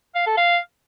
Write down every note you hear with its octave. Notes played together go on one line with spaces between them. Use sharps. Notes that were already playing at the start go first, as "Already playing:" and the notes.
F5
A4
F5